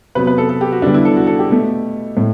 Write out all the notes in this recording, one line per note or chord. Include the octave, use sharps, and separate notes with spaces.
C3 F#3 B3 B4
B4
A4
A4
G4
F#4
D3 G3 B3 D4
E4
A4
F#4
A4
G4
B2 A3
A2